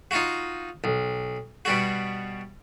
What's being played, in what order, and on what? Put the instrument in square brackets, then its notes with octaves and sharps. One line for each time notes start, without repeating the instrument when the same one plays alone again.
[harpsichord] D#4 F4 F#4
B1
B2 G3 F#4